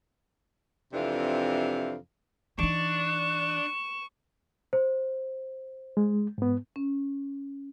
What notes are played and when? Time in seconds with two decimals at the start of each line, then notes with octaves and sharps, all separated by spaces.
0.92 F2 C3 E3 D4 F5
2.59 E3 D4 D#4 C#6 E7
4.73 C5
5.97 G#3
6.38 G#2 B3
6.76 C#4